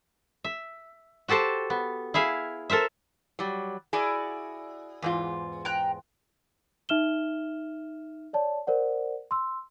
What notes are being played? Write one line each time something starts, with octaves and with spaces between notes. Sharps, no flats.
E5
F#4 G4 A4 C5 A5
B3
E4 G#4 E5 F5
A4 A#4 C5 E5
F#3 G3
E4 F#4 G#4 D5
E2 G#2 F4
G5 A#5 F#6
D#4 E5 F6 E7 G7
C#5 D5 A5
A#4 C5 D5 F#5
C6 E6